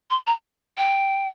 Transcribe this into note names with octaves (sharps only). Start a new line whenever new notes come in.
C6
A#5
G5